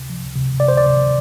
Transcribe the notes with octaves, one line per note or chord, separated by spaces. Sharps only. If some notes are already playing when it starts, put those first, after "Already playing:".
Already playing: C3
F3
C3
C3 D5
C5
D5
C3